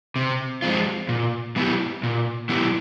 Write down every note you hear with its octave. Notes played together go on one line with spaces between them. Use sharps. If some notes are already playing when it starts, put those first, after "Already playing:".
C3
F3 G#3 C4 F4
A#2
F#3 B3 E4 G4
A#2
F#3 B3 E4 G4